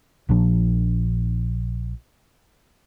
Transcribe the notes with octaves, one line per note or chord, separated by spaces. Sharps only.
A#1 A#2 F3 D4